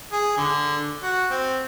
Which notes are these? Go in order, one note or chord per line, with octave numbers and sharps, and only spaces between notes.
G#4
D3
F#4
C4